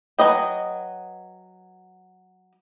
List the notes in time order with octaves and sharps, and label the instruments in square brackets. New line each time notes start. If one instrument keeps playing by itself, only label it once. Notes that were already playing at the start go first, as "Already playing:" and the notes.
[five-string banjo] F#3 G#4 B4 D#5 G5